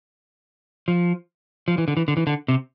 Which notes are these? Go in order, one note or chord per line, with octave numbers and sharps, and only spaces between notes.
F3
F3
E3
D3
E3
D3
E3
D3
C3